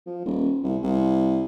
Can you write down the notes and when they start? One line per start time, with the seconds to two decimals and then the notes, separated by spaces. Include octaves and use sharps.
0.06 F3
0.25 D#1
0.63 C2
0.83 C2